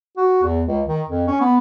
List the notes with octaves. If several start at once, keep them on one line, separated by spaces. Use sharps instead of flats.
F#4
E2
C#2
D#3
F2
C#4
B3